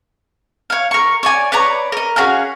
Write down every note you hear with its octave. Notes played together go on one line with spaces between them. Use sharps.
C#5 F5
A#4 C#6
C#5 D5 G#5
B4 C#5 D5 A#5
A#4 D#5
C#4 F#4 G#4 F5